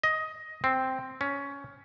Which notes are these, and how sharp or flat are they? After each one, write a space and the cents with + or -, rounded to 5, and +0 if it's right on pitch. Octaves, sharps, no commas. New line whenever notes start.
D#5 +15
C4 +0
C#4 +15